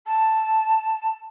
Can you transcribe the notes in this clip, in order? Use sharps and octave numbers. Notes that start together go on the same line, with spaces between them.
A5